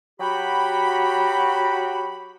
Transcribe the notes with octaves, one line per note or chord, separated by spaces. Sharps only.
F#3 F#4 G4 G5 B5